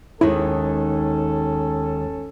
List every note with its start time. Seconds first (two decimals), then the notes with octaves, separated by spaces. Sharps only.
0.21 D#2 D#3 G#3 C#4 E4 A4